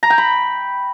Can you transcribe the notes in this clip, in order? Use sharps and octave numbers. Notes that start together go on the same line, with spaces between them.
A#5
G5
B5